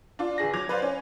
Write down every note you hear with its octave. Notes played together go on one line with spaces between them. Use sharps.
D4 F4
G1 G#4 A#6
F#3 D6 G#6 F7
B4 C5 D5 F5
C#4